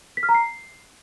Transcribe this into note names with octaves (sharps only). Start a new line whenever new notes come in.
B6
F6
A#5
C7